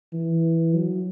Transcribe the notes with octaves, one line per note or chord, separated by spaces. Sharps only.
E3
F#3